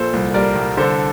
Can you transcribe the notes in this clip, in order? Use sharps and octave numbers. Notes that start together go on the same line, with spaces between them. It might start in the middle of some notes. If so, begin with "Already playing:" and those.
Already playing: A#1 A#2 A4 C5
C2
G3 A#4 D5
C2
D3 A4 C5